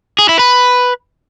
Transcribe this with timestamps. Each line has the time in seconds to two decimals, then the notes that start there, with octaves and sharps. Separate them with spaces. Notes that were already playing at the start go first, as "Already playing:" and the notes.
0.19 G#4
0.29 E4
0.39 B4